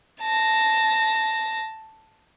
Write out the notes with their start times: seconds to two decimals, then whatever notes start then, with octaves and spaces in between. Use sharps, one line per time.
0.21 A5 A#6